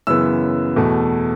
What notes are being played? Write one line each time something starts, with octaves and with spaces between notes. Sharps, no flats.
F#2 C#3 E3 B3 E6
E2 B2 A3